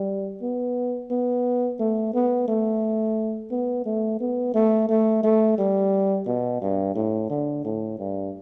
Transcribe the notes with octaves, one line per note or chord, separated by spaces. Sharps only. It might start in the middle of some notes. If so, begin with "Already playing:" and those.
Already playing: G3
B3
B3
A3
B3
A3
B3
A3
B3
A3
A3
A3
G3
B2
G2
A2
D3
A2
G2